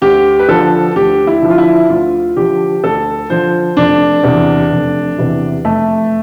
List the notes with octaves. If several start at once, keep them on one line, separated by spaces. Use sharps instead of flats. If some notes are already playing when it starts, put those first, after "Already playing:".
D2 G4
B4
D3 F3 A4
D2 G4
E4
D3 F3
F4
E4
D2 F4
D3 F3 G4
D2 A4
D3 F3 C5
F1 D4
E2 C3 E3
F1
E2 C3 E3
F1 A3